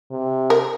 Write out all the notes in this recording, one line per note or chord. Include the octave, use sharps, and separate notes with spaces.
C3
A#4